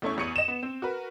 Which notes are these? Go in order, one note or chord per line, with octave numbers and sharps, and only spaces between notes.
E2 A3 C#4 E4 C#6
A1 E2 C#6 C#7 D#7 F#7
D#5 E7
B3
C4
F#4 A#4 B4